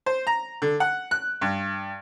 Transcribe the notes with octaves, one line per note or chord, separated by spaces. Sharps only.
C5
A#5
D3
F#5
F#6
G2